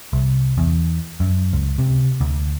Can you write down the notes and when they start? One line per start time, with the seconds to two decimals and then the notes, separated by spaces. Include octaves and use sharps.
0.13 C2
0.58 E2
1.20 F#2
1.53 C#2
1.78 C3
2.21 D2